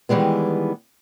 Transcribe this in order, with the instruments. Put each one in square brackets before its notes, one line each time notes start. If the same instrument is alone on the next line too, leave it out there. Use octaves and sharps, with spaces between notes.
[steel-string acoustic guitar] D#3 E3 G3 G#3 B3